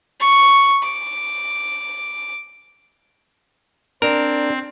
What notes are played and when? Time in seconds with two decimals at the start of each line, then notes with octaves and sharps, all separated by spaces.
0.20 C#6
0.83 D6
4.02 C4 D4 A#4